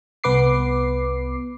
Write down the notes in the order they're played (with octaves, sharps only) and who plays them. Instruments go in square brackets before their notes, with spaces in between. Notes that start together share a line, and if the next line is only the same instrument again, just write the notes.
[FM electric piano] C2 B3 B4 D6 C7